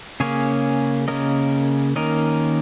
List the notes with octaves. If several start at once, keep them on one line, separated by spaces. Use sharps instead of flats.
C#3 A#3 C#4 G#4 C#5
C#3 A#3 C#4 A#4 D#5
D#3 A#3 C#4 A#4 D#5